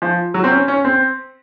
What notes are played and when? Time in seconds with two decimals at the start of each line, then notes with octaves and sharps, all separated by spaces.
0.02 F3
0.34 F#3
0.44 C4
0.51 C#4
0.68 C#4
0.85 C4